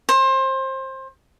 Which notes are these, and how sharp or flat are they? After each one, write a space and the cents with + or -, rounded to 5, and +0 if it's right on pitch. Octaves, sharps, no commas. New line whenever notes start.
C5 +25